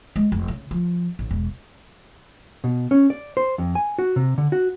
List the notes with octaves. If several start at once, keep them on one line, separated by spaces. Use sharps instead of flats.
G#3
F1
C#3
F3
A1
E1
B2
C#4
D5
C5
F2
G#5
F#4
C3
D3
F#4